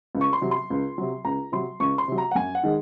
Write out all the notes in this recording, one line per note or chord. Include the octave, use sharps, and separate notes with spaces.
C#2
C#6
C6
C3 F#3
C6
C#2
C3 F#3
C#2 A#5
C3 F#3 C6
C#2 C#6
C6
C3 F#3
A#5
F#5
F#2 G#5
F#5
D#3 G#3